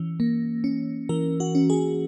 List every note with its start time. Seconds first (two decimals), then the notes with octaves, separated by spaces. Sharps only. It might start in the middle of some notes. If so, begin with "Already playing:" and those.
Already playing: E3 C#4
0.20 A#3
0.64 C#4
1.09 E3 A#4
1.40 F#4
1.55 C#4
1.70 G#4